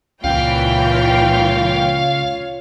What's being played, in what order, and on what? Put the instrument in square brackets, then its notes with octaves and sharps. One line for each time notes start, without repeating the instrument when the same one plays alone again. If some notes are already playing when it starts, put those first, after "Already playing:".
[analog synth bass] C#2 [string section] A#2 E3 G5 [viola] F4 C#5 [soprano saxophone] F5